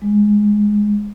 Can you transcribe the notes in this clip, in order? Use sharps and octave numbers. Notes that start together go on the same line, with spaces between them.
G#3